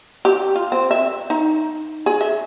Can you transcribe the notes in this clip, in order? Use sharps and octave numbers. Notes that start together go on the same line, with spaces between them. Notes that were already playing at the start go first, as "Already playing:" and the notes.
G4
F4
C4
E5
D#4
G#4
E5